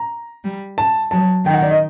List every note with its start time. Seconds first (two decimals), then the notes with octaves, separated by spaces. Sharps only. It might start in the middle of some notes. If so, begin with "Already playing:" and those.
Already playing: A#5
0.44 G3
0.78 A5
1.11 F#3 A5
1.46 D#3 G5
1.54 F#5
1.62 D5
1.71 D#5